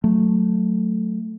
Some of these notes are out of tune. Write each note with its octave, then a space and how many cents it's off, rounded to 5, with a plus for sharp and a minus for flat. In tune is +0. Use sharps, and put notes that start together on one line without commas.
F#3 +0 A3 +0